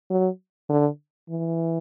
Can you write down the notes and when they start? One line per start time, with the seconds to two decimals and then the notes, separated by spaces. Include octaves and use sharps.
0.10 F#3
0.69 D3
1.29 E3